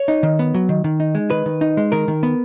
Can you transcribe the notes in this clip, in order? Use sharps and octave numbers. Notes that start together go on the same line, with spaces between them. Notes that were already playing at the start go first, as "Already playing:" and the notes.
Already playing: C#5
D#4
D#3
B3
F#3
D#3
D#3
D#4
G#3
D#3 B4
D#3
D#4
G#3
D#3 A#4
D#3
B3